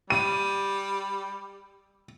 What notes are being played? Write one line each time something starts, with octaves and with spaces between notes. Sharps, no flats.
G3 D#7